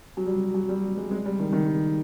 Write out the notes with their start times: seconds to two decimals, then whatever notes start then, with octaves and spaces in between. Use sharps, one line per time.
0.17 F#3
0.26 G3
0.54 F#3
0.69 G3
0.97 G#3
1.11 G#3
1.26 G3
1.39 D#3
1.53 D#3